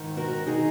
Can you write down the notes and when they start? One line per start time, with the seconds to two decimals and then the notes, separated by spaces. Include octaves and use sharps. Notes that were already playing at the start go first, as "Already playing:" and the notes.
Already playing: G#2 D#3
0.17 F#4 A#4
0.46 D#3 D#4 G#4